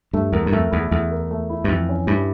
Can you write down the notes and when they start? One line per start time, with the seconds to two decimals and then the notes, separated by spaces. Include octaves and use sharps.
0.13 G2 A3
0.33 E2 A#4
0.46 G2
0.52 F2 A3
0.71 E2 E4
0.91 E2 A3
1.11 A#4
1.31 A3
1.49 E4
1.64 G2
1.69 F2 E3
1.89 C#4
2.07 G2 E4